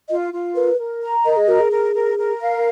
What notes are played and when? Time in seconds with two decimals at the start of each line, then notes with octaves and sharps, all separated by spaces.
0.09 F4 D#5
0.33 F4
0.55 A#4 B4
0.78 A#4
1.02 A#5
1.25 A#4 D#5
1.37 G#4
1.47 F#4 A#4
1.60 G#4
1.71 A#4
1.94 A#4
2.18 A#4
2.41 F5